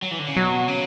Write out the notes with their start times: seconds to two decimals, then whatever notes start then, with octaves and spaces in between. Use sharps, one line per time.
0.02 F#3
0.11 E3
0.19 D3
0.28 C#3
0.36 B2 F#3
0.68 C#3